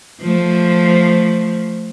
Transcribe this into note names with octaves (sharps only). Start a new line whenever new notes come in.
F3 A3